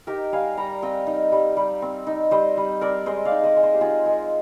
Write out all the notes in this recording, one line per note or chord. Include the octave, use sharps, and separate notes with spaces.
D#4 G4 A#4
G3 F5 G#5
G3 G5 A#5
C4 D#5 G5
D#4
G3
G3
C4
D#4
G3 C5 D#5
G3
C4 A#4 D5
G#3 C5 D#5
D5 F5
D#4
C5 D#5
G#3
C5 D#5
G4
D#4 F4 G#4
G#3